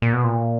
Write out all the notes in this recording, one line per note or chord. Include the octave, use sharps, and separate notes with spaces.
A#2
B2
A#2